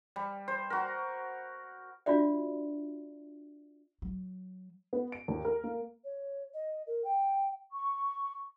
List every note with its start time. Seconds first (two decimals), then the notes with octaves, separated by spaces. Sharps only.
0.16 G3
0.48 C5
0.70 F#4 A#4
2.06 D4 F4 F#4 D5 E5
4.02 F#3
4.93 B3
5.12 D7
5.28 D#2
5.45 A#4
5.64 A#3
6.04 C#5
6.54 D#5
6.87 A#4
7.04 G5
7.71 C#6